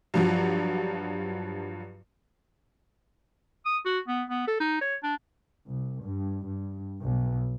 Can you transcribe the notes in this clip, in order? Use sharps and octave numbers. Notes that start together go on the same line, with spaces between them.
G2 F3 F#3
D#6
F#4
B3
B3
A4
D#4
C#5
D4
C2
G2
G2
B1